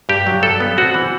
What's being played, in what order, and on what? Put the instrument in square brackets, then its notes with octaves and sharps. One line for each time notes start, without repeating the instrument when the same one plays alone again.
[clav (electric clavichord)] G2 G4
F#3
G2 A4
B3
C4 F#4
E3